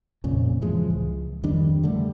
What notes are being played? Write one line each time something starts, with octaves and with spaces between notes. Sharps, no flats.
F2 A#2 C#3
A2 E3 F3 G#3
C#2
F2 D#3 G3 D4
D3 G3 A3